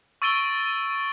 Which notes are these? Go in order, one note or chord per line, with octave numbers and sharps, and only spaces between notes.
C#6 E6 A6 D7 D#7 G7